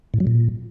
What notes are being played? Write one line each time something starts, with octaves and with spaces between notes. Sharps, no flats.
A2
F#3
A#2